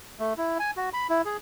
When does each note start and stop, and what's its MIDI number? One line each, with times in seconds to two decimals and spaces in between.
0.19 0.33 57
0.37 0.58 64
0.59 0.71 80
0.77 0.90 66
0.93 1.07 83
1.09 1.22 64
1.25 1.37 68